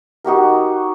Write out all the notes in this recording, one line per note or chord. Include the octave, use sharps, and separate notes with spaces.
D#4 F#4 G4 A#4